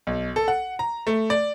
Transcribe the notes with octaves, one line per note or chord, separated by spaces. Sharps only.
B1
A4
F#5
A#5
A3
D5